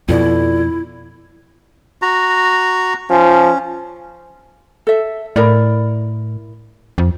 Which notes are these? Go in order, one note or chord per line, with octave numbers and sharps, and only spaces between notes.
F2 B2 E4 F4 A4 D5
F#4 A#5
F3 C#4
A4 E5
A2 E4 A#4 D5
F2